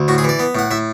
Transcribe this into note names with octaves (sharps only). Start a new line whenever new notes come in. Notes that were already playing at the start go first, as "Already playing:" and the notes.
Already playing: D2
A2 F#4
G#4
E3 D5
B3
A2 F#5
A2 E5